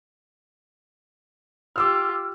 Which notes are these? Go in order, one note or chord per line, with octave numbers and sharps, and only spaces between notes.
F4 G4 D6 E6 F6